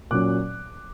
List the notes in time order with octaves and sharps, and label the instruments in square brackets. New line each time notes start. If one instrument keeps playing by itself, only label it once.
[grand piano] A#2 F#3 C#4 D6 F#6